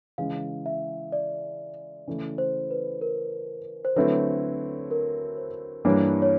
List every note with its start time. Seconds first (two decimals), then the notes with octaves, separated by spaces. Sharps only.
0.18 C#3 E3 G#3 F5
0.66 E5
1.12 D5
2.07 C#3 E3 A3
2.38 C5
2.71 B4
3.01 A#4
3.85 C5
3.96 D3 F#3 A3 C4 E4 B4
4.91 A#4
5.37 C5
5.85 G2 E3 G3 A#3 D4 C#5
6.22 C#5